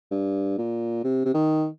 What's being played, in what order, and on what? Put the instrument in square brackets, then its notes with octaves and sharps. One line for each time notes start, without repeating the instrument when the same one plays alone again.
[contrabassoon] G2
A#2
C3
C3
D#3